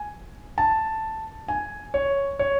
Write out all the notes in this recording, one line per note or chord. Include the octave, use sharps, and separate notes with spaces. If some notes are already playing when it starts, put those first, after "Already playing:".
Already playing: G#5
A5
G#5
C#5
C#5